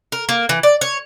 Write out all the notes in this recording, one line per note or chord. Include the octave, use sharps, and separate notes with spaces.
A#4
A#3
E3
D5
C#5